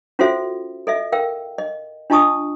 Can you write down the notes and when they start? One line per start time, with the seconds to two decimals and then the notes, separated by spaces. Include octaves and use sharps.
0.19 C#4 F4 F#4 A4 C5 E5
0.87 A4 D#5 E5
1.12 A#4 F5 G5
1.58 D#5
2.10 D4 F4 D#5 A5 C#6 D#6